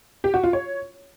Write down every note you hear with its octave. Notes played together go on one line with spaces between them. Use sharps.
G4
F#4
F4
C#5